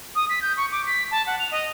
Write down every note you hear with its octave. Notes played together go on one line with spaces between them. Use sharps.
D#6
B6
G6
C#6
D6
B6
A5
F#5
F7
D#5